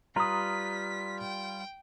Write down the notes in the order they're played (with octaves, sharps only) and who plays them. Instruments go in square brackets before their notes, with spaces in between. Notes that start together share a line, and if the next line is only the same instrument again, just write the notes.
[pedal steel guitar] G3 F4 B4 [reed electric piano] A#5 D#6 [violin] B6
[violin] G5